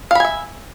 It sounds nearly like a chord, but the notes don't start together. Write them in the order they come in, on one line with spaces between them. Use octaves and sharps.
F5 B5 G#5 E5